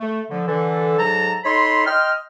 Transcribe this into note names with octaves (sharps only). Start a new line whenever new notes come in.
A3
D3 F3
D3 E3 A4
G#2 F#3 A4 A5 A#5
D#4 A4 C#5 B5 C6
D#5 G5 C6 F6